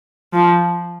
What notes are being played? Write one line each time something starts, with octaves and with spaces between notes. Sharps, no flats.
F3